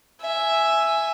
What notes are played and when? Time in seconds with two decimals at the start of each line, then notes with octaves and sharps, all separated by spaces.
0.22 E5 G#5